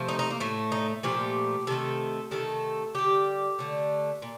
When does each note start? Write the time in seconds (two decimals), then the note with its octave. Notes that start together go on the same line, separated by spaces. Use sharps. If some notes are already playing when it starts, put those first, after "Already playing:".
Already playing: C3 F3 A3
0.09 D#4
0.19 D#4
0.30 A#3
0.40 A2 A3
0.72 D#4
1.03 A#2 F3 A3 G4
1.67 C3 D#3 A3 A4
2.31 C3 D#3 A3 A4
2.95 D3 G3 G4
3.59 D3 A3
4.22 A#2